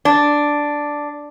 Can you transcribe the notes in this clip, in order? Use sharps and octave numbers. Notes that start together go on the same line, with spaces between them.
D4